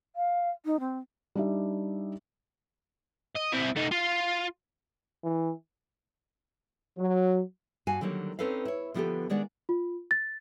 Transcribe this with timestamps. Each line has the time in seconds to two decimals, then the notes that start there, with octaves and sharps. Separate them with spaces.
0.16 F5
0.65 D#4
0.80 C4
1.35 G3 D4 D#4 G4 E5
3.36 D#5
3.53 C4 E4
3.76 A3 D#4
3.92 F4
5.24 E3
6.98 F#3
7.87 G2 F#4 F5 G#5 A5
8.01 D3 D#3 F#3 G3 A#3
8.39 C4 C#4 D#4 A4 B4 F5
8.65 E4 C#5
8.94 D3 F3 B3 F4 G4 A4
9.30 D#3 G#3 D4 D5 F#5
9.69 F4
10.11 A6